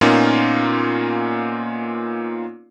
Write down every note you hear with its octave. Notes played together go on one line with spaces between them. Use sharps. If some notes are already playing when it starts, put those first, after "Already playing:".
A#2 A#3 B3 C#4 D#4 F4